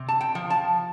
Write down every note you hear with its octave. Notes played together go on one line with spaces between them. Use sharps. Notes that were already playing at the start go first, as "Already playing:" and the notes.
Already playing: C3
A5
G5
F3
A5